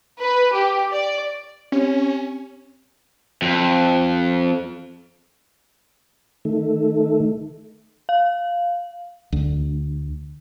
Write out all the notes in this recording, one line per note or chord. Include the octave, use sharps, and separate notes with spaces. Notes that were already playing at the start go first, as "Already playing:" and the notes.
B4
G4
D5
C4 C#4 G4 C#5
F2
D#3 A3
F5
D2